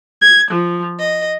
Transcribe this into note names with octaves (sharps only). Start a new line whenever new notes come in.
G#6
F3
D#5